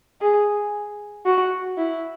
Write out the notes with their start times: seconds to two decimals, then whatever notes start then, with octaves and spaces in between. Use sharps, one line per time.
0.21 G#4
1.26 F#4
1.78 E4